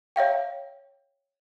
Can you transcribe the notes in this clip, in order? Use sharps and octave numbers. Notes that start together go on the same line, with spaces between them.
C#5 E5 F5 G5